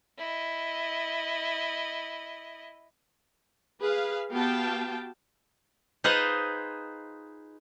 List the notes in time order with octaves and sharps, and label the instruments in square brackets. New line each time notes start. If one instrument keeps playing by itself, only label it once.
[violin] E4 D#5
[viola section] G#4 B4 F5
B3 F#4 G4 F5 G5 A5
[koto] D#4 F4 G#4 B4 C5 D#5